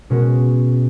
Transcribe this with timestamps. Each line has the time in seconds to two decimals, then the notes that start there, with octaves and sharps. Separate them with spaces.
0.10 B2 G#3 C#4 F#4